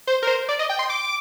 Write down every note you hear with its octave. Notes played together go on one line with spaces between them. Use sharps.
C5
A#4
C5
D5
D#5
G5
C6
D6